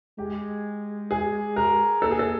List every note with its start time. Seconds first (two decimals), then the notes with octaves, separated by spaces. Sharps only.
0.18 G#3 G4
1.11 G#4
1.56 A#4
2.02 A#3 A4
2.11 G#4
2.19 A4